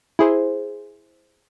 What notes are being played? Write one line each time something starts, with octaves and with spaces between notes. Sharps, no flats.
E4 G#4 C5